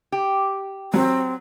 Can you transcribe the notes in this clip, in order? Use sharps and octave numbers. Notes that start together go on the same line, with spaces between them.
G4
F#3 C4